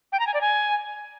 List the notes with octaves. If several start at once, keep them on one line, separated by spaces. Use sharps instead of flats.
G5
A#5
G#5
D5
G#5